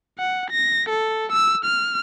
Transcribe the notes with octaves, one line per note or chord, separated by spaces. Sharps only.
F#5
A#6
A4
E6
F6